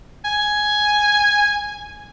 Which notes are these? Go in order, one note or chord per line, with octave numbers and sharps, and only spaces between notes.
G#5